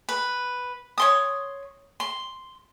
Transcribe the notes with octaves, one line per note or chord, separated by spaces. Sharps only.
B4
C#5 C6 D#6
C6